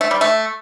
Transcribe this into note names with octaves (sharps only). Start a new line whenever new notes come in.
A3
G3
A3